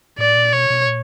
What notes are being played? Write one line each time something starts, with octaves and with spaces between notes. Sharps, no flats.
A2 D5
A#2
B2 C#5
B2
A#2